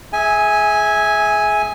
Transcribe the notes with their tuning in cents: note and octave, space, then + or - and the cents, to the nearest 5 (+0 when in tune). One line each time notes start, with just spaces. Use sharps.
G#4 +15 E5 -20 G#5 +0